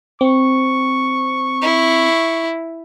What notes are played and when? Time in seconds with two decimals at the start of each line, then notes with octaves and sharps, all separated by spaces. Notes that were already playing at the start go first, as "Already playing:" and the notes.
0.21 C4 C#6
1.62 E4